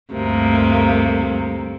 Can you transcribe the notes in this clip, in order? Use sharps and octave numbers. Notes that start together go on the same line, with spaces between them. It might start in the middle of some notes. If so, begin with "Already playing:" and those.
D2 G2 C3 A#3